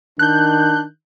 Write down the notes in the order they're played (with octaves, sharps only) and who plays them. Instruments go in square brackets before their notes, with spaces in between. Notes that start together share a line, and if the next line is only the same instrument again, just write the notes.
[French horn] D#3 [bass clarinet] D4 [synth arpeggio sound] F#6 G6